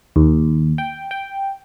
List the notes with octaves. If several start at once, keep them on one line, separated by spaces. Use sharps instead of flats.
D#2
G5
G5